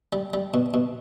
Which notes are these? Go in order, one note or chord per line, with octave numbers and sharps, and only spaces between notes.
G3
G3
B2
B2